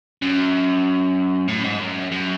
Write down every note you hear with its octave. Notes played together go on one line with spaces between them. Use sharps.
F#2
A2
G#2
F#2
F#2